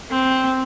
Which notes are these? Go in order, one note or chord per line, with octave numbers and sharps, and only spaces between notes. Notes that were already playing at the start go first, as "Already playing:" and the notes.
C4